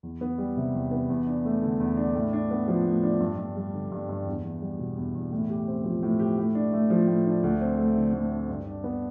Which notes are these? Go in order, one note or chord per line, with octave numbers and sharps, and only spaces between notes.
E2
B3
G3
C3
E2
B3
E2
D4
A3
D3
E2
D4
A2
D4
B3
F3
A2
D4
G2
G2
G3
D3
G2
G2
E2
E2
G3
B2
E2
E2
A2
G4
C4
F3
A2
G4
A2
D4
A3
F3
A2
D4
D2
C4
A3
D3
D2
C4
G2
D4
B3